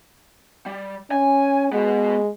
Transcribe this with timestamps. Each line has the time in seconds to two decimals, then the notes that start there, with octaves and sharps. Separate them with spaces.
0.66 G3
1.11 C#4 G#5
1.73 G#3 B3 F#4